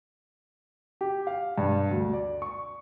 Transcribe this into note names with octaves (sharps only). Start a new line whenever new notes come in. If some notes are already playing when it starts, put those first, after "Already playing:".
G4
F5
G2
D2
D5
C#6